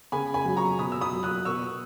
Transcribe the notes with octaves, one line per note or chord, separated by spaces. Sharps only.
C#3 G#5 B5
G#5 B5
F#3
A#5 C#6
B2 B5 D#6
E6
B5 D#6
F#3
D#6 F#6
B2 C#6 E6